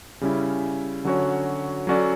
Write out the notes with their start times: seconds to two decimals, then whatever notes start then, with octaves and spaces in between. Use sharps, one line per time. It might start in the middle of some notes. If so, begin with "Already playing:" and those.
0.21 C#3 G3 C#4 E4
1.05 D3 F#3 C#4 F#4 C#5
1.87 F#3 C#4 F#4 A4 D5